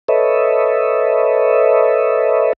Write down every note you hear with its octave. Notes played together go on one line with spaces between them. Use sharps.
A4 B4 C#5 D#5 E5